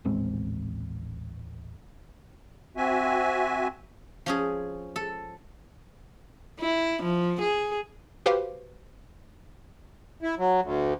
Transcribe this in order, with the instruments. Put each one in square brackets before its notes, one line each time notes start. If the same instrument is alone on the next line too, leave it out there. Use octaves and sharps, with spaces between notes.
[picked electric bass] D#1 A1 G#3 C4
[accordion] C4 F#4 E5 G#5
[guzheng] F3 C#4 G#4
A4
[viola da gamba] E4
F3
G#4
[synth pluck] F#4 G4 B4 C5 F5
[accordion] E4
F#3
D2